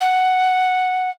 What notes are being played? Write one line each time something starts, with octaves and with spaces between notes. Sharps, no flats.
F#5